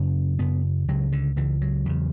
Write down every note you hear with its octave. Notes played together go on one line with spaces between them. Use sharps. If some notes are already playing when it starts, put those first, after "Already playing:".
Already playing: F#2 C#3 C#4
F#2 C#3 B3
C#2 C#3 F#3
D3
C#2 C#3 E3
F#3
E2 C#3